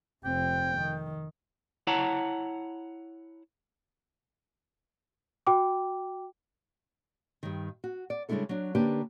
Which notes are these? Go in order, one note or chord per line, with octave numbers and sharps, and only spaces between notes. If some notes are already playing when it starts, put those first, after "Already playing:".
F1 C4 G5
D#3
E4 C#5 F#5 A5 A#5
F#4 G5 D6
G2 D#3
F#4
D5
C#3 G3 G#3 D4 E4 A4
F#3 D4
D3 A#3 C#4 D4 G4 B4